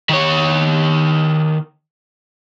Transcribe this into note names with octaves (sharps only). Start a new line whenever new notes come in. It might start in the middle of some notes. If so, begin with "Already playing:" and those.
D#3 C#5